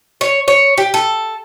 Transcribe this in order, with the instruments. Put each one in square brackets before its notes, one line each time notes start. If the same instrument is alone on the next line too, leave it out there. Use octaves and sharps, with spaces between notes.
[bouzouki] C#5
C#5
G4
A4